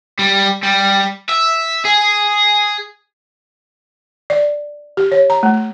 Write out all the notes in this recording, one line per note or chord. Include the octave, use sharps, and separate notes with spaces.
G3
G3
E5
G#4
D5
G4
C#5
A#5
A3